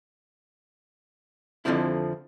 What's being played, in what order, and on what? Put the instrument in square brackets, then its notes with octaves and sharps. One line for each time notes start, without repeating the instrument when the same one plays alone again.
[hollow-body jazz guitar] F2 B2 D3 F3 C4 E4